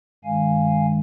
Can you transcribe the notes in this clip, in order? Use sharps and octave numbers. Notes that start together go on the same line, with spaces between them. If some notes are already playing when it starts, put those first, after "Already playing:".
G2 D#3 G#3 F5 G#5